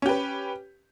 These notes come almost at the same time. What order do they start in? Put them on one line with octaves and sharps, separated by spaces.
C#4 G4 B4